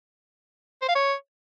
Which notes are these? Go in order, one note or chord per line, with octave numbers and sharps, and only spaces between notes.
C5
F5
C#5